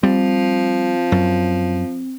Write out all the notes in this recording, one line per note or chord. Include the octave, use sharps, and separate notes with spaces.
F3 G3 C4
F#2